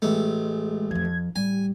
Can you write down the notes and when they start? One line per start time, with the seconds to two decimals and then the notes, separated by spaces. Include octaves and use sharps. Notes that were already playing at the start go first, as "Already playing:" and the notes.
0.02 A1 G#3 A3
0.91 F2 F3 G#6
1.36 A1 G3 G#5